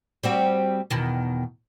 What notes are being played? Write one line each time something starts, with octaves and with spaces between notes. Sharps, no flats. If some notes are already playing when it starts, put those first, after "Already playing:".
G3 C4 F#4
E2 B2 D#3